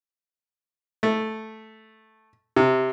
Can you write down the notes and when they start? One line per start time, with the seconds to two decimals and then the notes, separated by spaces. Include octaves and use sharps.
1.03 A3
2.56 C3